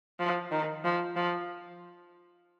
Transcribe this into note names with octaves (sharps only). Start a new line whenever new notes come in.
F3
D#3
F3
F3